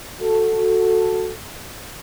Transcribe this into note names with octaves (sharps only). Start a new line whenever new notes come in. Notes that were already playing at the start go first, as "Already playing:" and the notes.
F#4 A4